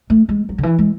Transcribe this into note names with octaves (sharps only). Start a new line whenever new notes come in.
A3
G#3
F#3
D3
E3
G#3